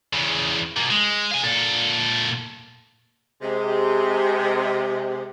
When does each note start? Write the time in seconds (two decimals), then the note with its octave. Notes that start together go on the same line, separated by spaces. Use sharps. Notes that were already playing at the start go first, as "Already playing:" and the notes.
0.13 E2 C#3
0.77 B2 A#3
0.91 G#3
1.32 F5 G#5
1.44 A#2 A4
3.41 C3 G#3